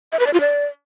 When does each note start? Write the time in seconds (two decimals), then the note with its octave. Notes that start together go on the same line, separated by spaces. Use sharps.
0.12 E5
0.19 B4
0.26 D5
0.33 F4
0.40 D5